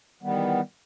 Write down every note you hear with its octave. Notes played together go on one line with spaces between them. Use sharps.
E2 D#3 G3 B3